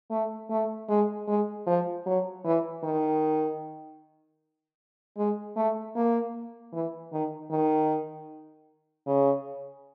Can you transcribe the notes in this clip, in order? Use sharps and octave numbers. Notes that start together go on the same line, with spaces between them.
A3
A3
G#3
G#3
F3
F#3
E3
D#3
G#3
A3
A#3
E3
D#3
D#3
C#3